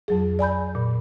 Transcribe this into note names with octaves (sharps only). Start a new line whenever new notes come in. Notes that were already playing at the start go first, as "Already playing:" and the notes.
F2 F#3 G#4
D5 G#5 B5 G6
A#2